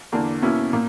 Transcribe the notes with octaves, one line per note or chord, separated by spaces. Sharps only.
E2 D3 A#3 D4
B2 A#3 C#4 E4
A#2 A#3